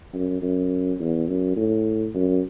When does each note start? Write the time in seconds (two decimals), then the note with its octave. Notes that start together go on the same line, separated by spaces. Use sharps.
0.14 F#2
0.42 F#2
0.99 E2
1.28 F#2
1.57 A2
2.14 F#2